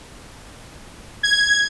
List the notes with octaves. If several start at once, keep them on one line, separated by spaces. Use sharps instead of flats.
G#6